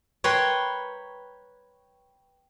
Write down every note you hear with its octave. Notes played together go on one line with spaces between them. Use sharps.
B4 C#5 G5 A#5 C6